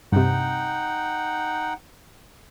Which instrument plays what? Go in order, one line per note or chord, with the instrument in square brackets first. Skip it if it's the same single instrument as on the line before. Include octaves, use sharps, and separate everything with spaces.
[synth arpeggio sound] G2 C3 [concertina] D#4 F#5 G5